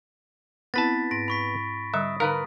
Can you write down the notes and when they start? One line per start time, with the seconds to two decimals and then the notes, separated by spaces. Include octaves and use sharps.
0.74 B3 C4 E4 B4 A5 A6 B6
1.11 G#2 A#6 D7
1.28 B5 C#6 B6
1.94 D3 G3 E5 D#6
2.20 D3 D#4 A#4 B4 F5